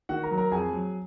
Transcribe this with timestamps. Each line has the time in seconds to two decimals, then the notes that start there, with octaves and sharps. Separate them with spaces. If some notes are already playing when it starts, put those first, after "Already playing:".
0.09 D#3 F#4 F#5
0.23 A#4 A#5
0.31 F#3
0.38 A#4 A#5
0.52 F2 G#4 G#5
0.73 F#3